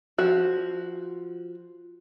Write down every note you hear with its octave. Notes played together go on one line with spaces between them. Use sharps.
F3 F#4